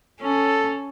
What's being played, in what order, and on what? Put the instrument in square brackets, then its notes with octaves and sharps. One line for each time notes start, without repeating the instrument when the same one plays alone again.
[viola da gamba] C#4 [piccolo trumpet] A4